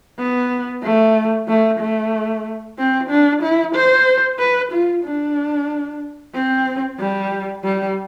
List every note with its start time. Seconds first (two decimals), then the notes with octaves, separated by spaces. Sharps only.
0.19 B3
0.83 A3
1.48 A3
1.80 A3
2.78 C4
3.10 D4
3.42 E4
3.75 C5
4.39 B4
4.72 F4
5.04 D4
6.34 C4
6.99 G3
7.64 G3